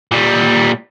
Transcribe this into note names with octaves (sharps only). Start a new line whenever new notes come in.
A#2 G3